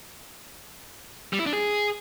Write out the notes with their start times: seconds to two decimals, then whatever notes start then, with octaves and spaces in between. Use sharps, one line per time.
1.33 G3
1.40 E4
1.46 D4
1.53 G#4